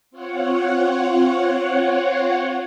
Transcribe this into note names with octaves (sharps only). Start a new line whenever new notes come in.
C4 F4 C#5 F#5